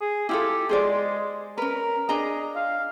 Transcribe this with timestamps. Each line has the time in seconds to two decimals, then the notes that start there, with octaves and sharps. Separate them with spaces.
0.01 G#4
0.29 E4 F4 G4 A4
0.69 G#3 G#4 C5 D5
1.58 C#4 A#4 B4
2.09 D4 G#4 D#5 A#5
2.56 F5